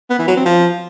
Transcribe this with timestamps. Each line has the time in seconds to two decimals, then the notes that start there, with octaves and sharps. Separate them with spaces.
0.10 B3
0.19 E3
0.28 F#3
0.37 C4
0.45 F3